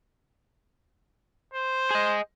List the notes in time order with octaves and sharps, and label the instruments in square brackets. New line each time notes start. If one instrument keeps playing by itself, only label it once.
[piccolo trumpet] C5
[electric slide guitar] G#4 D#5